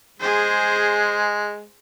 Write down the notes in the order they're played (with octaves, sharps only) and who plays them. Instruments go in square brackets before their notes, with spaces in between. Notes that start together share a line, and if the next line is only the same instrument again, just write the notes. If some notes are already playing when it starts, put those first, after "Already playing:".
[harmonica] G#3 [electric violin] G#4 C5